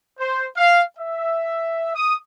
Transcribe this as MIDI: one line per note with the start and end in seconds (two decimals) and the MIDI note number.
0.19 0.45 72
0.55 0.81 77
0.98 1.92 76
1.94 2.15 87